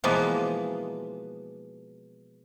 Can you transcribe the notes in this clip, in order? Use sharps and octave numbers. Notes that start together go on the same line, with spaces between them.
B2 E3 F3 G#3 A#3 B3